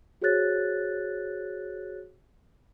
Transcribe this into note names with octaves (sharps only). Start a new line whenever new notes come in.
F#4 G#4 C5 C#5 F#6 A6